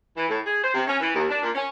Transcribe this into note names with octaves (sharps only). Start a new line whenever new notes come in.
E3
A2
G#4
C5
C3
C#4
E3
D#2
D4
A#2
C#4